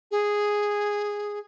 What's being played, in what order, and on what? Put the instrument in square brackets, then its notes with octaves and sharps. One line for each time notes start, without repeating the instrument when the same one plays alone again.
[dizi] G#4